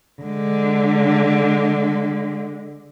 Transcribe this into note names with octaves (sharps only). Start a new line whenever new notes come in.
D3 G#3